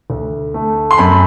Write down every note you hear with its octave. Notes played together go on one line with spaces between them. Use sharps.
D2
A3
C6
F#2 B5